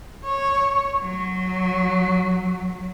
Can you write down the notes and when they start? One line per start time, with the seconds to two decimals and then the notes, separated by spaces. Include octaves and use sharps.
0.25 C#5
1.02 F#3